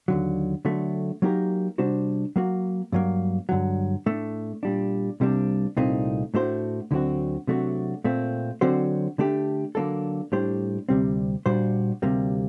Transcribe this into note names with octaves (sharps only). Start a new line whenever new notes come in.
D#2 D3 F#3
D3 F#3 A3
F#3 A#3 D#4 G4 A#4
C3 G3 D4 F#4 C5
F#3 A#3 F#4
G2 F#3 A#3
G2 D3 F#3
A2 A3 D4
A#2 G3 D4
C2 C3 G3 A#3 D4
C2 A#2 A3 C4 D#4
A2 A3 D4 F#4 C5
D2 D3 F#3 C4 F#4
C3 F#3 A3 D4 F#4
A#2 A3 C4
D3 F#3 C4 F#4 C5
D3 A3 D4 G4
D3 F#3 A#3 D4 A4
A2 G3 D4 G4 C5
D2 C3 G3 C4
A#2 G3 D4 F#4 C5
D2 C3 G3 A#3